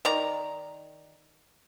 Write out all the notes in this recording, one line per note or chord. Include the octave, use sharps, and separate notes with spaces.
D#3 D5 A#5